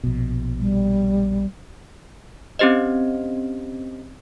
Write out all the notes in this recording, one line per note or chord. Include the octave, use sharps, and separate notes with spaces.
A#1 B2
G3
C4 C#4 G4 C5 D#5